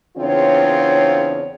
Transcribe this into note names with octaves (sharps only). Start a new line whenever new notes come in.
E2 C#3 C4 D4 F4 C#5